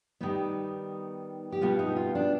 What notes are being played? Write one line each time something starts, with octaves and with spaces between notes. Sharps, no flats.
D#3 G3 B3 D#4
G4
B2 G3 B3 F4
D#4
F4
D4